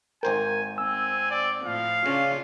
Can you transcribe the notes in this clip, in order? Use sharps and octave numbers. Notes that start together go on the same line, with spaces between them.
G#1 A#4 C5 G5 G#5
C4 G#5 E6
D5
A2 F3 F5
C#3 C#4 D4 F4